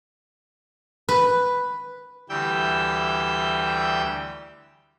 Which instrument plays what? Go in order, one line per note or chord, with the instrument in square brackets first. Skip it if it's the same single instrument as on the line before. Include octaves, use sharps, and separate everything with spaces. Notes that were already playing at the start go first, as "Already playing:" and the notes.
[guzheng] B4
[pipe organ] D2 E3 G3 G5 E6 G6